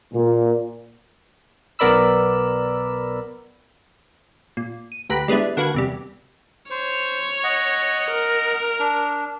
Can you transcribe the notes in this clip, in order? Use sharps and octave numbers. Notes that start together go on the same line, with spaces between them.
A#2
B1 B3 A#4 D5 B5 E6
A#2
D#7
D2 G4 B4 A#5 F#6 B6
G3 G#3 B3 D4 E4
D3 A#3 F#4 B4 G#6
E2 C3 G3
C5 C#5
D#5 F#5
A#4
D4